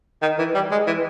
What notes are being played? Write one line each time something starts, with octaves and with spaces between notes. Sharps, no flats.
D#3
E3
G3
G#3
E3